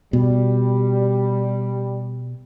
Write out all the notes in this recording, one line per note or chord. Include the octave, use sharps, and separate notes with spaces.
B2 G3